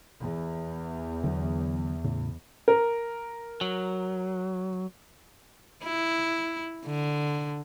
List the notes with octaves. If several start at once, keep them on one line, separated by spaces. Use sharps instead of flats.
E2
D3 F#3 B3
A2 C#3
A#4
F#3
E4
D3